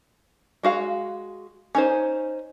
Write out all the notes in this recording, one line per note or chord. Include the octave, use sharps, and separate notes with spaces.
G#3 F#4 F5
C#4 D#4 C5